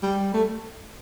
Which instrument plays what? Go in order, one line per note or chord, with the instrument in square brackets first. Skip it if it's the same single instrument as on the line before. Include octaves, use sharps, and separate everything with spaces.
[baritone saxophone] G3
A3